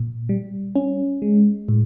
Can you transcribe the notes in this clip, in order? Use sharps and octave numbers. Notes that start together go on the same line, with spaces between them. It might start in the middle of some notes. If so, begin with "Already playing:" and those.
Already playing: A#2
G3
C#4
G#3
A2